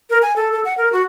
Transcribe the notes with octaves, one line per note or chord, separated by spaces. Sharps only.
A#4
G#5
A4
A4
F#5
A#4
F#4